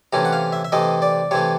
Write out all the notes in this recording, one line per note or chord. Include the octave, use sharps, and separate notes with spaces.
C3 E3 A3 C#4 A#5
F#5
F5
E5
E5
C3 E3 A3 D#5
D5
C3 E3 A3 C#5